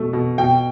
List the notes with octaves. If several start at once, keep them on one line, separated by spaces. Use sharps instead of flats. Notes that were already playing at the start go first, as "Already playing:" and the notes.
Already playing: B2 A3
B2
B2 G5